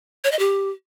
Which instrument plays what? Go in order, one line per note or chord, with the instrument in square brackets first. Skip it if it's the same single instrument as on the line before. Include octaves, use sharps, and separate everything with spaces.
[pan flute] C#5
D#5
G4